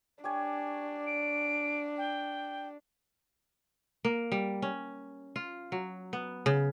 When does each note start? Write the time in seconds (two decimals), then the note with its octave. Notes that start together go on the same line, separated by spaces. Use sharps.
0.24 D4 G4 C#5 G#5
1.07 D7
1.98 G5
4.05 A#3
4.32 G3
4.62 C#4
5.36 F4
5.72 F#3
6.13 B3
6.46 C#3